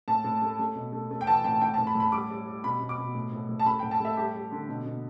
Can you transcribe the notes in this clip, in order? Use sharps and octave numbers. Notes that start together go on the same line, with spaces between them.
A2 A5
A2
A3
A3
B2
A3
A3
G5
E3 A5
A2 G5
A2 G5
A5
A2
B5
A2
B5
G3 D6
G3
G3
B2 B5
B2
D6
B2
A2
A2
A2
A5
A3 B5
G5
A2
A5
A3 E5
G3 G4
G3
D3
B2
B2